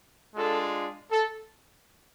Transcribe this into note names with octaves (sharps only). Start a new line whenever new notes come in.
G#3 D4 F4 A4
A4